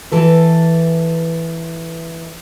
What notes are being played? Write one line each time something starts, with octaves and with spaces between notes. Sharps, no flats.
E3 A4 B4